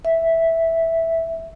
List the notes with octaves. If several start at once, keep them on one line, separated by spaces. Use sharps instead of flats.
E5